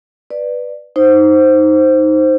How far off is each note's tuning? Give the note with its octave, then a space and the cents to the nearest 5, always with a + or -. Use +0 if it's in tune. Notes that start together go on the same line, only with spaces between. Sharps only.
B4 +0 D5 +15
D#4 +0 C5 +0